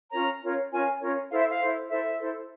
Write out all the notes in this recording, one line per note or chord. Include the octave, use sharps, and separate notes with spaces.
C#4 F4 A#4 C#5 A#5
C#4 F4 A#4 C#5
C#4 F4 A#4 C#5 G#5
C#4 F4 A#4 C#5
E4 A4 C5 F5
E5
F5
E4 A4 C5
E4 A4 C5 E5
E4 A4 C5